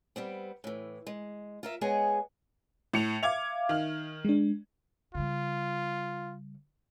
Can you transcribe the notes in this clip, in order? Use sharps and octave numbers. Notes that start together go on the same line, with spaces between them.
G3 B3 C4
A2 E3
G#3
F4 A#4 E5
G#3 B3 G#4 C#5 D#5
A2 C#7 F7
E5 F5 D6 G#6 F7
D#3 F6
G#3 D4
C#3 G3 F4